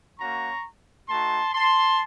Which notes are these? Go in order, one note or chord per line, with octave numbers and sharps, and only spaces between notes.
A#3 C#4 F#4 A#5 C#6
A3 D#4 F#4 A5 C6
A5 C6